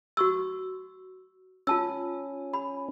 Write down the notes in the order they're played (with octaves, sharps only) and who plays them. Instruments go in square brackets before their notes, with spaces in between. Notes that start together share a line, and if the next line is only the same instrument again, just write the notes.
[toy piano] F#4 C#6 E6
[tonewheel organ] C#4 [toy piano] F4 A5 E6
[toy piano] B5